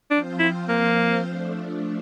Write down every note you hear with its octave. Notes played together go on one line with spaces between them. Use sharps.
F3 C4 D4 F4 C5
E4
A#3
F3 A3 D4